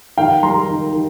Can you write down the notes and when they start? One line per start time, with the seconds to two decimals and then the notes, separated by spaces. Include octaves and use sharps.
0.17 D#3 F5 G5
0.42 G3 A#5 C6
0.68 D#3
0.93 D#3